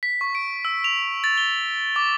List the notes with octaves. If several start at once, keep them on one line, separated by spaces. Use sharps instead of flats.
B6
C#6
D7
E6
F7
A6
G7
D6